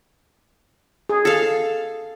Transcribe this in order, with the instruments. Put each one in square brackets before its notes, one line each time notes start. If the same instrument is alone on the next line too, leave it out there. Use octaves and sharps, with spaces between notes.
[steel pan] G#4
[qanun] A4 F5